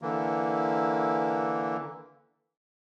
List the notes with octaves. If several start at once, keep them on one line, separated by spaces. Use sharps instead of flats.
D3 E3 A#3